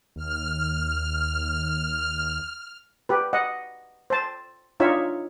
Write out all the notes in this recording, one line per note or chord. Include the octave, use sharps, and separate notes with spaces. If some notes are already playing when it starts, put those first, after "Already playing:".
D#2 F6
G4 B4
D#5 F#5
C5 A5
D4 D#4 F4 C#5 E5